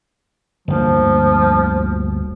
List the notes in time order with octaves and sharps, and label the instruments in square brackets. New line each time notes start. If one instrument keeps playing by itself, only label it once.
[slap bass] G1 D2 A#3 [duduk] F3